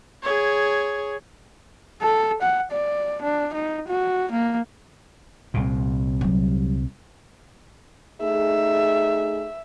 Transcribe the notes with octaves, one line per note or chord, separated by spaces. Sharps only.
G#4 C#5
A4
F#5
D5
D4
D#4
F#4
A#3
C2 A#2
F#3 G3
A3 D#4 G#4 E5